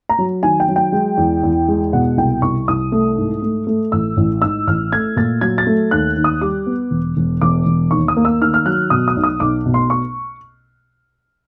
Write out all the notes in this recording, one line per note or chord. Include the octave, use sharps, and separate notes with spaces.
A#5
F#3
D#3 G#5
G5
F#3
G5
G#3
E2
E2
G#3
B2 F#5
C2 G5
C2 C#6
C2 D#6
A3
G#2
A3
A3
A1 E6
A1
G#2 E6
A1 F6
A3 G#6
A#2 A6
F#3 G#6
A6
A3
D#2 F#6
D#2
D#6
G3 D6
B3
E1
E1
E1 D6
E1
D#2 C#6
D#6
A#3
E6
D#3 F6
F6
F#3 F#6
B2 D#6
D#6
B1
D#6
B1 D6
B2
C6
C#6